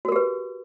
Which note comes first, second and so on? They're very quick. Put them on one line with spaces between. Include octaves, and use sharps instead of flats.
F#4 A#4 G4 B4